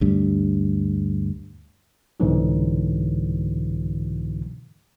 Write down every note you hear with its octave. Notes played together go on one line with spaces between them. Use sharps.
D2 G2
C2 G#2 B2 D3 E3 F#3